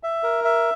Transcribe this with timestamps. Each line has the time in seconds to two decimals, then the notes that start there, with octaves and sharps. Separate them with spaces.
0.03 E5
0.23 A#4
0.44 E5